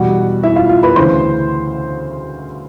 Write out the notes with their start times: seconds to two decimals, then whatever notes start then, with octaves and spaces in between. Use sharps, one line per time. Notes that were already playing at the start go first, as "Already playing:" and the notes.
Already playing: E2 B2 G3 F#4 F#5
0.43 E4 E5
0.56 F4 F5
0.69 F4 F5
0.83 B4 B5
0.96 D2 C#3 E3 C5 C6